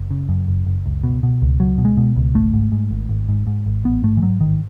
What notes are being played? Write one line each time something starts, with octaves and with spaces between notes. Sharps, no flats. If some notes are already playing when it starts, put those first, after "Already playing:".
Already playing: F#1
C#3
F#2
F#1
F#1
C#2
B2
B2
C#2
C#2 F#3
B2
G#3
B2
C#2
G#1 A3
G#2
G#2
G#1
G#1
G#2
G#2
G#1
A1 B3
G#2 A3
E3
G#2 F#3
A1 D#3